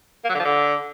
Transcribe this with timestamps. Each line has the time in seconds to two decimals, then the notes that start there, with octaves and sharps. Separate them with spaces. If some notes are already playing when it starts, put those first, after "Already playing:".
0.24 A#3
0.29 F#3
0.35 D3
0.40 F3
0.45 D3